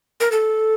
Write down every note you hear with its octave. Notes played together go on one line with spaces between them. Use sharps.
A#4
A4